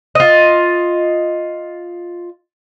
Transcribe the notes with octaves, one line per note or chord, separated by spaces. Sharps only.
F4 D#5